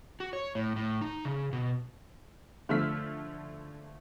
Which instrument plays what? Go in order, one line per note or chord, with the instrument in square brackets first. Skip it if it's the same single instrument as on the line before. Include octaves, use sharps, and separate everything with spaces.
[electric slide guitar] F#4
C#5
A2
A2
D#4
C#3
B2
[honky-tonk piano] D3 F3 A3 E6 F6 B6